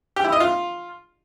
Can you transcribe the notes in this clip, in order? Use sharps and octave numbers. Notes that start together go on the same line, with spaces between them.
G4
E4
D#5
F4